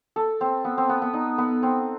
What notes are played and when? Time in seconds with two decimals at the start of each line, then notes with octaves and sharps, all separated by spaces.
0.16 A4
0.41 C4
0.65 B3
0.78 C4
0.89 B3
1.02 B3
1.13 D#4
1.38 B3
1.63 C4